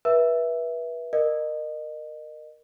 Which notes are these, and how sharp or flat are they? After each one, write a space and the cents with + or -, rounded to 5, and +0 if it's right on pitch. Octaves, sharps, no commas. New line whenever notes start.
B4 -30 E5 +0
A#4 +0 D#5 -30